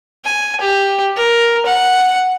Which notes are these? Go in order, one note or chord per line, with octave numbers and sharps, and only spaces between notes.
G#5
G4
A#4
F#5